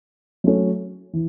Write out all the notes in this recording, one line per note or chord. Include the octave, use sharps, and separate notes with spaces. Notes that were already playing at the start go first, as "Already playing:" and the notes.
F#3 A3 C#4
E3